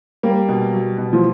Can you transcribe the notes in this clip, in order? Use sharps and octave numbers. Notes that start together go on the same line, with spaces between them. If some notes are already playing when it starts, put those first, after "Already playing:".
G3 A#3
B2
F#3
B2
F3